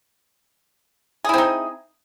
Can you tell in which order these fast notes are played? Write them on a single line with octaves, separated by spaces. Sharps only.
G#4 E4 C4 D#4